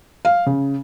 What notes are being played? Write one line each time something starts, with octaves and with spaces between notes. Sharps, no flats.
F5
C#3